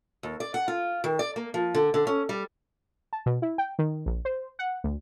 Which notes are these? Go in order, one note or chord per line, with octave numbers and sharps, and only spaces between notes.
D#2
D5
F#5
F4
D#3
D5
A#3
F3
D3
D3
C#4
G3
A5
B2
E4
G5
D#3
A#1
C5
F#5
D2